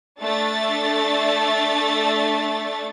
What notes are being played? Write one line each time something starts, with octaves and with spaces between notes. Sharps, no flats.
A3 D4 A6